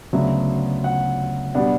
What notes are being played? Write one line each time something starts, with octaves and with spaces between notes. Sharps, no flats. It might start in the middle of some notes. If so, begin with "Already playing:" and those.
D2 C#3 F#3 B3 D4 E5
F#5
B2 G3 B3 D4 F#5